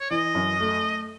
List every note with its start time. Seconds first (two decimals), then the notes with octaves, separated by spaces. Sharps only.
0.01 C#5
0.10 E3 D#5
0.35 F#2
0.60 A3